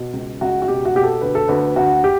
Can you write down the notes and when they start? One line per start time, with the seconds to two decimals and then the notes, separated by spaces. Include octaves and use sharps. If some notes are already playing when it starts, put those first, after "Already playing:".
Already playing: B2
0.13 C#2
0.41 C#2 F#4
0.62 F#4
0.68 B2 G4
0.85 F#4
0.95 B2 G4
1.03 A4
1.21 D2 B4
1.35 A4
1.48 D2 B4
1.76 D2 F#4
2.04 G4